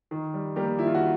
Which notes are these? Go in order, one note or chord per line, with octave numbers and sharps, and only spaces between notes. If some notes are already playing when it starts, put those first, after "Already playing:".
D#3
G3
G3 A#3 G4
D#3 E4
F4
F#4